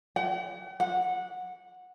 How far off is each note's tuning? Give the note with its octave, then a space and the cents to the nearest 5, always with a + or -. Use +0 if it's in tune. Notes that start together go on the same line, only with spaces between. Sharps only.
F#5 +45
F#5 -15